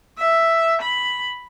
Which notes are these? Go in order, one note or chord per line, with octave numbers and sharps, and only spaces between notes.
E5
B5